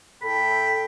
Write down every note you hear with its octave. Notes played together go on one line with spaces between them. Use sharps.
A2 A4 G5 B5